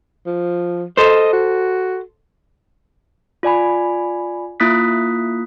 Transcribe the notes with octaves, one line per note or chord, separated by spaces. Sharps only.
F3
A4 C5 D#5
F#4
F4 D5 G#5 B5
A#3 E4 F4 D#6 F#6 B6